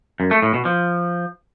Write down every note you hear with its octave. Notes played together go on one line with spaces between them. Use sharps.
F#2
A3
A2
B2
F3